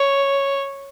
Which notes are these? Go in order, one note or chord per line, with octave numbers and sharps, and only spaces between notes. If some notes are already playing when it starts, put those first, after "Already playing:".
Already playing: C#5